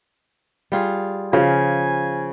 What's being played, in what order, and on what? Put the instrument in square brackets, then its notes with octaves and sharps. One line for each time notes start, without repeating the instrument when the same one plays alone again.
[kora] G3 F4 G#4
[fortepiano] C#3 [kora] F3 [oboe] G#5